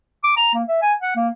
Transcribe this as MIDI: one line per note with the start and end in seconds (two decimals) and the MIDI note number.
0.24 0.33 86
0.36 0.50 82
0.54 0.63 58
0.68 0.78 76
0.82 0.93 80
1.01 1.15 78
1.16 1.29 58